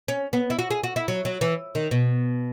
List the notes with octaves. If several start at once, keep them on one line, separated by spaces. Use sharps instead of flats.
C#4
B3
E4
F#4
G#4
F#4
E4
F#3
F#3
E3
D#3
B2